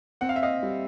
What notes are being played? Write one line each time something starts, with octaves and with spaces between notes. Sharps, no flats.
C4 F#5
F5
E5
D#5 F5
G3